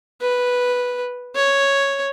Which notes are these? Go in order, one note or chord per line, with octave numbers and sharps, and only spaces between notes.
B4
C#5